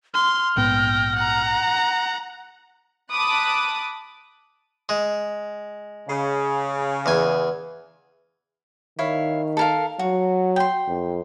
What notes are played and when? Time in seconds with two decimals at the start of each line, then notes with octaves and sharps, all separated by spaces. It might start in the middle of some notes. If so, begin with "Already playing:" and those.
0.14 C6 F6
0.57 A#1 G#2 B3 G5 A#6
1.15 F#5 A#5
3.12 A5 B5 D6 D#6 F#6
4.89 G#3
6.08 C#3
7.06 E2 G#5
8.99 D#3 E4 C#5 F5
9.57 A4 A#4 F5
9.99 F#3 F#4
10.56 G5 C6
10.88 F2